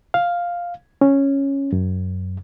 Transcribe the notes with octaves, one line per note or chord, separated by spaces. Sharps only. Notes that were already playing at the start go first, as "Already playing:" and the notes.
F5
C#4
F#2